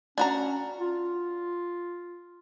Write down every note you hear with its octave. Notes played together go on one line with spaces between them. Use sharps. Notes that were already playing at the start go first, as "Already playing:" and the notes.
C#4 D4 F#4 A#5
F4